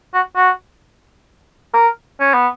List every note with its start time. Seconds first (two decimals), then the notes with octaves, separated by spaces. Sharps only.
0.14 F#4
0.36 F#4
1.74 A#4
2.20 C#4
2.34 B3